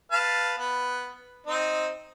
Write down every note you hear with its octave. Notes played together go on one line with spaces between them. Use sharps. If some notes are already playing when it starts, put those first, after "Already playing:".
B4 F5 A5
B3
C4 D#4